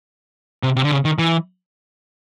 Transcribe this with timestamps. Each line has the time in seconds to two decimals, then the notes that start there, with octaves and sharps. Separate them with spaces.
0.63 C3
0.76 C3
0.84 D3
0.92 C#3
1.05 D#3
1.18 E3